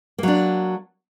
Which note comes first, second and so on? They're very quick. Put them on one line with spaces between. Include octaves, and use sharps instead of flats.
A#3 F#3 D4